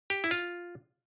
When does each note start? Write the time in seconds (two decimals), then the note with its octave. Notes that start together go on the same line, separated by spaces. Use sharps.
0.10 G4
0.24 E4
0.31 F4